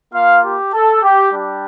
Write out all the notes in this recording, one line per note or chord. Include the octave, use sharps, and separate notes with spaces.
A#3 F4 F5
G4
A4
G4
G3 D4 G4